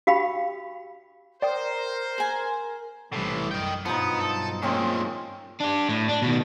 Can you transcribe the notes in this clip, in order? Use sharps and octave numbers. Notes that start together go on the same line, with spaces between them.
F#4 G4 F5 G5 B5
A#4 C5 D5 G5 D#6
G#4 G#5
B1 A2 C3 E3 G3
F#2 D#5 G5
G2 B2 F3 F#3 B3 D#4
A4
A#2 D#3 G#3 C4 C#4
D4 G4
A2
D4
B2 D#3